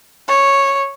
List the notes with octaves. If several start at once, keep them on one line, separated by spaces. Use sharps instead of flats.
C#5